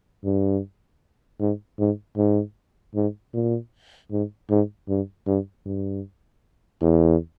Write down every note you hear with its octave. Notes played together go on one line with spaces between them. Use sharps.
G2
G#2
G#2
G#2
G#2
A#2
G#2
G#2
G2
G2
G2
E2